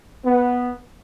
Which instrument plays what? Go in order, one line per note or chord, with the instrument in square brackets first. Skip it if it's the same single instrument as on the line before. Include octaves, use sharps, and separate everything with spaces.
[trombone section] B3